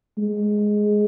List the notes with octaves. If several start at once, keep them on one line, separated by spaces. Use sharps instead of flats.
G#3